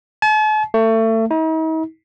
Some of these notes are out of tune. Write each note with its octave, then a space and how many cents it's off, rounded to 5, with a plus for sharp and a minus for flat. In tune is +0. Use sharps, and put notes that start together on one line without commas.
A5 -45
A3 +30
D#4 +45